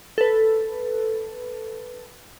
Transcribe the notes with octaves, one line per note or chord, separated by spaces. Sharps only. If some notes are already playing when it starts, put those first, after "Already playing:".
A4 B4